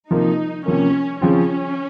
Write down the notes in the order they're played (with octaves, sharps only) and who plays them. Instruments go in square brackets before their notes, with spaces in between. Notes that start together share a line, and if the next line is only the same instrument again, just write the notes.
[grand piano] C3 F3 A#3 [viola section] D#4
[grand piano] C3 F3 A#3 [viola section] C#4
[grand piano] C#3 F3 C4 F4 [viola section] C#4